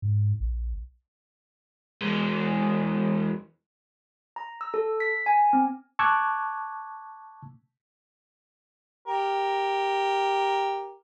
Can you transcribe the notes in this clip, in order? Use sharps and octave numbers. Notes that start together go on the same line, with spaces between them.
G#2
A#1
E2 G#3
A#5
E6
A4
B6
G#5
C4
A5 C#6 D6 E6 F#6 G#6
G4 A#4